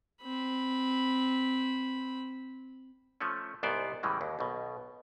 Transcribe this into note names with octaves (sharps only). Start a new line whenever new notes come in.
C4 B5
F3 A3 C#4
C2 G#2 B3 C5 D5
A2 C#3 E3 G3 G#3
D#2
B1 B2